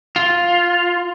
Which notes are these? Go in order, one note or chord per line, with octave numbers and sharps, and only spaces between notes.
F4